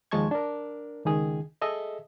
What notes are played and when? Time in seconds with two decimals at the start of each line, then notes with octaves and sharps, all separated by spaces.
0.11 D#2 F3 G#3 A5 C#6 G#6
0.31 D4 A#4
1.05 C#2 D#3 G#4
1.62 G#4 A4 D#5 E5